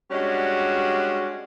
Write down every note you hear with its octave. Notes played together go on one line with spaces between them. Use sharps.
G3 G#3 C#4 D4 F#4